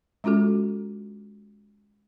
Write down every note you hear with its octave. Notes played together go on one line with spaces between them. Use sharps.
G#3 C#4 F4 F#4 A4